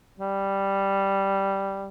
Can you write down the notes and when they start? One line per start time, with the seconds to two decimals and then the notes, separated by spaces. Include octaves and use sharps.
0.20 G3